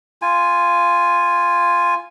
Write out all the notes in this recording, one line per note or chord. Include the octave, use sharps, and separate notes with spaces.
F4 G#5